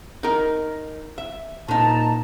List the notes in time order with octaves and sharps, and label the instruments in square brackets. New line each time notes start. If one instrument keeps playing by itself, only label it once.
[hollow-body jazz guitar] D#4 A#4
E5
[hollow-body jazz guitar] A#2 D#4 [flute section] A5 A#5